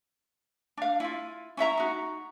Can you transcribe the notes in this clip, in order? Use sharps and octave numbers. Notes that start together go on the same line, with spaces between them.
D4 F5
E4 F4
C#4 E4 E5 A#5
D#4 F#4